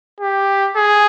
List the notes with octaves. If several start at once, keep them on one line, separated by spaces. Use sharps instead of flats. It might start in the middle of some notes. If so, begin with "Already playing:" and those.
G4
G#4